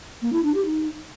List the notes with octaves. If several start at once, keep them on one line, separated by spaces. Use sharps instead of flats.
A#3
E4
D4
G4
D#4